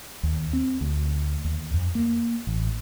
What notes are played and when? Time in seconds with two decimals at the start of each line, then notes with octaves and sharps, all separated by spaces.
0.23 D#2
0.53 C4
0.81 D2
1.44 D#2
1.74 F2
1.95 A#3
2.47 A1